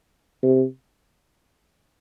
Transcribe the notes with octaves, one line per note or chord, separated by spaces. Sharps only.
C3